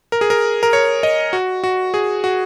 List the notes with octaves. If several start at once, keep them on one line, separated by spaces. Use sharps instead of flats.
A#4
G#4
A#4
A#4
C#5
D#5
F#4
F#4
G#4
F#4